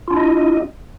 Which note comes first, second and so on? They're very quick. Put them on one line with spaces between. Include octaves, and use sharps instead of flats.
F4 D4 E4 D#5